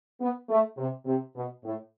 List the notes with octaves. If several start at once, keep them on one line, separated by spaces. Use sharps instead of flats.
B3
A3
C3
C3
B2
A2